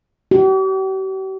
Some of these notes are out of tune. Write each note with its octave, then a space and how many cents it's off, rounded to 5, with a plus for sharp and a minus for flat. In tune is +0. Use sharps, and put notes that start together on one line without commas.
G4 -45